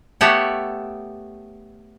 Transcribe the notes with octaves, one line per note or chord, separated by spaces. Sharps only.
A3 B3 G4 A4 C#5 F#5